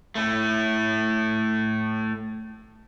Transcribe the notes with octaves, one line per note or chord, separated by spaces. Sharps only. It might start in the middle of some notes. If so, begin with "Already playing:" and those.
A2 A3